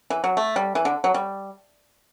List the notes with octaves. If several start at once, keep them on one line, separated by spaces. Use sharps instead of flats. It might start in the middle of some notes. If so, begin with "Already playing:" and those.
E3
F#3
A3
G3
E3
D3
F#3
G3